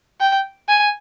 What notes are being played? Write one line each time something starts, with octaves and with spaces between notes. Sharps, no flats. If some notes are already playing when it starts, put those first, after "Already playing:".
G5
G#5